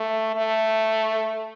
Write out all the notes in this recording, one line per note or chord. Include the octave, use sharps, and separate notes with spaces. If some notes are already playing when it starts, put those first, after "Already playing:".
Already playing: A3
A3